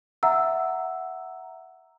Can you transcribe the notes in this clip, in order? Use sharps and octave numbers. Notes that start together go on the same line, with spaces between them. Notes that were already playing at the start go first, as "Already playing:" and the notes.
E5 F#5 A#5 E6